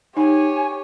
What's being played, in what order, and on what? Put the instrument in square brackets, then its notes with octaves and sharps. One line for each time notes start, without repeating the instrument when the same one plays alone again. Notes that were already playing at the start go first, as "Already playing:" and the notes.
[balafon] D#4 [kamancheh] G4 C#5 [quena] G#5